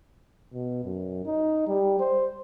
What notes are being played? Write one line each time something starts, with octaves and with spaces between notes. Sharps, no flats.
B2
F#2
D#4
G3
C5